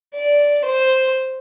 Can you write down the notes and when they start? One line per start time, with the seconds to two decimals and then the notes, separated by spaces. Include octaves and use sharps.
0.15 D5
0.65 C5